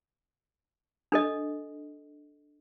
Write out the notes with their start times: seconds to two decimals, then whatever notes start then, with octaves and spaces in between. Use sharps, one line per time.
1.12 D4 A4 D#5